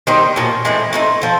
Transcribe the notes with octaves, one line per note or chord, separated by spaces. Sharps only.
D#3 G3 C4 D#4
A#2 F3 A#3 C#4
A2 E3 G#3 C4
A3 C4 D#4
F3 A3